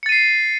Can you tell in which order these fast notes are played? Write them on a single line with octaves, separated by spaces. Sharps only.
C#7 A6 D#7 C7